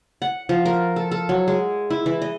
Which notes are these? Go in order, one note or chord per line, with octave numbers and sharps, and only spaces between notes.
F#5
F3
A#4
A4
A4
F#3
G#3
E4
E3
D#5